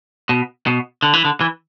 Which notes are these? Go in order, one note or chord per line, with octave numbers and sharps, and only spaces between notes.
B2
B2
D3
E3
D3
E3